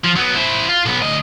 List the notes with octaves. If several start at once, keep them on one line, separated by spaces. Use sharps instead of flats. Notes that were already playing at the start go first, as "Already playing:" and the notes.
F3
F#3 B3
E4 C5
F4
B1 B3
D2 D#5